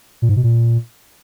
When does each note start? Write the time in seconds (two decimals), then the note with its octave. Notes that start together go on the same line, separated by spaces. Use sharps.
0.22 A#2
0.29 G#2
0.36 B2
0.43 A#2